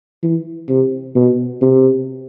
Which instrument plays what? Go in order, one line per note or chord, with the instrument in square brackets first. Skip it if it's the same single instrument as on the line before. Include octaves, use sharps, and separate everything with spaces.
[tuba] E3
C3
B2
C3